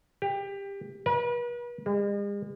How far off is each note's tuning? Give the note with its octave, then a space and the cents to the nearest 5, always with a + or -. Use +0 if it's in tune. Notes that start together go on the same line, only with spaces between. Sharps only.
G4 +20
B4 -40
G#3 -45